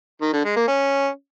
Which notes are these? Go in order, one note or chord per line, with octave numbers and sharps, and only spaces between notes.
D#3
D3
G#3
A#3
C#4